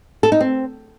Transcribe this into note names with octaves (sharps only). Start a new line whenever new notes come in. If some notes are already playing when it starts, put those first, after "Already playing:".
A4
D#4
C4